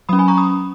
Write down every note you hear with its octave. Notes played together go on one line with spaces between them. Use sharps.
F#3 C#4 B5 D#6
G#5 B5
A#5 C#6
B5 D#6